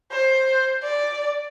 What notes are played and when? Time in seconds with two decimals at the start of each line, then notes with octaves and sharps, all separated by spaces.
0.12 C5
0.83 D5